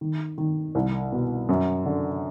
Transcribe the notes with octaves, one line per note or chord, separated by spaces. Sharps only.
D#3
D#3
C2
B2
F#2
D3